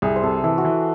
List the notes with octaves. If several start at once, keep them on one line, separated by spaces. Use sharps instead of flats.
C2 G#4
C5
C3 A4
E3 A4
F#4
E3